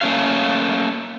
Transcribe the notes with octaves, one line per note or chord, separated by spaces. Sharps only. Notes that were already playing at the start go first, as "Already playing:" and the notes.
A3 A#3 C#4 F#4 F5